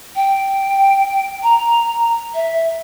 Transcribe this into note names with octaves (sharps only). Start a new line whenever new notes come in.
G5
A#5
E5